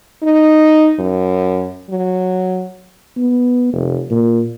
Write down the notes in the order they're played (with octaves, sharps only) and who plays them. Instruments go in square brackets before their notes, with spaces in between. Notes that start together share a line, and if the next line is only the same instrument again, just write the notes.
[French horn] D#4
F#2
F#3
[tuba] B3
F1
A#2